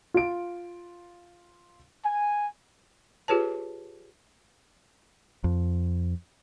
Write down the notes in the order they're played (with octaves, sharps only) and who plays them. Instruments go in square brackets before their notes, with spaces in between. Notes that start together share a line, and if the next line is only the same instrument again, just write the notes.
[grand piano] F4 D7
[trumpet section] G#5
[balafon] F4 G4 G#4 B4 C#5 A5
[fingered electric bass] F2